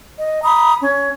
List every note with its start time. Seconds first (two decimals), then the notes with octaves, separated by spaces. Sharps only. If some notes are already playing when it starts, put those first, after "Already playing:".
0.17 D#5
0.42 A#5 B5 D#6
0.82 C#4